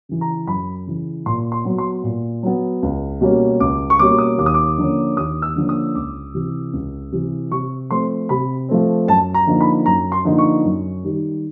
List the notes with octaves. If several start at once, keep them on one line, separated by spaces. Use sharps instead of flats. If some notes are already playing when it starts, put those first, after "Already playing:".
C#3 E3
A#5
F#2 B5
C#3 E3
A#2 C6
C6
F#3 B3
C6
A#2
F#3 B3
C#2
B2 G3 A#3 C#4
C#2 D6
C#6
B2 G3 A#3 C#4 D6
D#6
D#2 D6
D#6
D6
D3 F3 A#3 C#4
D#2 D#6
E6
D3 F3 A#3 C#4
D#6
C#2 D6
C3 E3
C#2
C3 E3
C3 C#6
F3 A3 C4 C6
C3 B5
F3 A3 C4
F#2 A5
A#5
D3 F3 A#3 D#4
B5
F#2 A#5
C6
D3 F3 A#3 D#4
C#6
F#2
D#3 G3